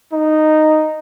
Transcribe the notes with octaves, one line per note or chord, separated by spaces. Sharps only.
D#4